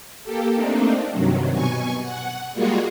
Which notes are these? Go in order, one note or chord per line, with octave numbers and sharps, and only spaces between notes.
A#3 G4 A4
A3 A#3 C4 D4 D#4
G2 C3 D#3 F#3
B2 G#5 C#6
F#5
G3 G#3 A#3 F4 F#4 G#4